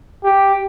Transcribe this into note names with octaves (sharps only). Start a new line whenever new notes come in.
G4